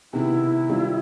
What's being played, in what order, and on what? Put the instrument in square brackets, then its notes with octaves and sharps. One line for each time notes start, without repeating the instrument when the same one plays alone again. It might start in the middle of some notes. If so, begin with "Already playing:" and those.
[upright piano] C3 D#3 G#3 B3 [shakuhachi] E4
[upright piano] D#3 G3 C4 F4